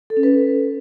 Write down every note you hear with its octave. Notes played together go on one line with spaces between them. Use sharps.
A4
C#4
B4